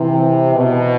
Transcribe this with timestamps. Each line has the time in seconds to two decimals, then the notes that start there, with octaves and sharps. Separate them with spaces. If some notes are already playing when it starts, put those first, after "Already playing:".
Already playing: C3 E3
0.55 B2